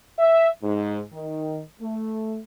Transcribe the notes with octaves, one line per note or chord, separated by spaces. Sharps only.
E5
G#2
D#3
A3